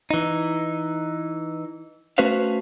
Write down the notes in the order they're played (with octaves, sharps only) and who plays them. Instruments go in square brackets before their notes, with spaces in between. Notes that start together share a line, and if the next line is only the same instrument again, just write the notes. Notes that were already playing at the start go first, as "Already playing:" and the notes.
[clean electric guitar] E3 D#4
A3 C#4 F#4 B4 C5 F5